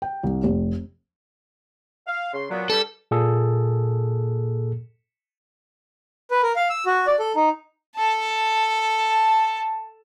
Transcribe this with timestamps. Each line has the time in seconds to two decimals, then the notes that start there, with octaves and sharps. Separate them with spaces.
0.02 G5
0.23 C2
0.43 F1
2.07 F5
2.34 C#3 C6
2.50 A#2 F#3 B3
2.70 G2 G3 A4
3.11 A#2 A#3 G#4 A4
6.31 B4
6.43 A#4
6.56 F5
6.70 E6
6.86 F#4
7.07 D5
7.19 A4
7.36 D#4
7.97 A4 A5